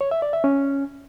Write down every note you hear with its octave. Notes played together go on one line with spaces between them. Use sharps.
C#5
E5
D5
E5
C#4